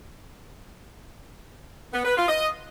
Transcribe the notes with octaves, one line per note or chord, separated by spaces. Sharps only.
B3
B4
F4
D#5